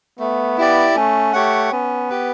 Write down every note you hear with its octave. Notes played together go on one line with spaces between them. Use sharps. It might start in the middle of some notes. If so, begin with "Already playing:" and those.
A3 B3
E4 G4 D5
A3 C#4
A3 G4 C#5 F#5
B3 C#4
G4 B4